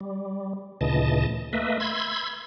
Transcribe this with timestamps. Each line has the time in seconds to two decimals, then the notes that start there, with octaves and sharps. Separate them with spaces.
0.01 G3
0.81 D2 A#2 C#3 E3 D#5 A5
1.53 A3 A#3 B4 D#5 E5
1.80 B5 C6 E6 G#6